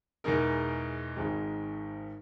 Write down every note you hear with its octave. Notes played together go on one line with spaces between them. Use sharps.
E2 B2 G#3 D#4 A#4
G#1 G#2 D#3 G#3